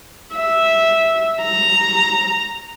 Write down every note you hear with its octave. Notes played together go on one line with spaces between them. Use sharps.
E5
A#5